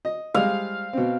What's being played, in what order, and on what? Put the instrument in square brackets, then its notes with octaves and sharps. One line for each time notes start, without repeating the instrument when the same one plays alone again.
[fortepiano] D#5
[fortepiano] G3 G#3 D#5 [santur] F5
[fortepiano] B2 C4